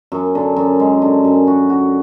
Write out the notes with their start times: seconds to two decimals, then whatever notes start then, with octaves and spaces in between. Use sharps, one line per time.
0.12 F#2
0.35 D3
0.56 F#2
0.80 G#3
1.02 D3
1.24 F#2
1.47 F#4
1.70 F#4